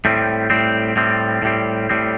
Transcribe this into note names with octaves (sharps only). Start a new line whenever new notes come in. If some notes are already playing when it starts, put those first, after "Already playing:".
A2 G3 C4
A2 G3 C4
A2 G3 C4
A2 G3 C4
A2 G3 C4